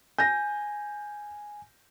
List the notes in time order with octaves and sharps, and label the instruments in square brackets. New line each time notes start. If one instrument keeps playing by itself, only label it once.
[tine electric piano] G#5 [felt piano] G6 A#6